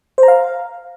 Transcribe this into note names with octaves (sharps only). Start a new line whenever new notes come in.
C5
A#5
F5